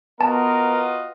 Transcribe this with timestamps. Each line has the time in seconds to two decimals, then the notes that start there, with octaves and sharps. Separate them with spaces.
0.21 B3 F4 F#4 A#4 D#5 A5